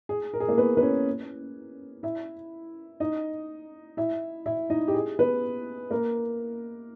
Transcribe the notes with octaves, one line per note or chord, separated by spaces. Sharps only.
G#4
A#4
G#4
A#3 A#4
B3 B4
B4
C#4 C#5
E4 E5
D#4 D#5
E4 E5
E4 E5
D#4 D#5
G4
G#4
B3 B4
A#3 A#4